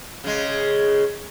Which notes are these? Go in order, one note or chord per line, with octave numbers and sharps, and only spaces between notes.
C#3 G#3